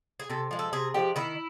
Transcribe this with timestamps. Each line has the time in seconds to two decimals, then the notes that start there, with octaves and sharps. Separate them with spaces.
0.20 G#4
0.30 C3 A4
0.51 F3 G#3
0.59 A4
0.73 C3 G#4
0.94 F3 G#3 G4
1.16 D#3 E4